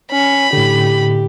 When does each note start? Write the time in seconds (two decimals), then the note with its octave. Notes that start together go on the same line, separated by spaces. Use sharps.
0.12 C#4 B5
0.53 A2 D3 G4